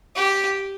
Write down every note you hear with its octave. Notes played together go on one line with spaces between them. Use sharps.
G4